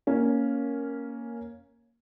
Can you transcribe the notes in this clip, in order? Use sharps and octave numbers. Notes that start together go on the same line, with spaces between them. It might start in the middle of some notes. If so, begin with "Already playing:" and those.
A#3 C#4